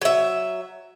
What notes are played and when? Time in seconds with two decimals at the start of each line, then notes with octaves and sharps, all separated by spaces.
0.02 F#3 E5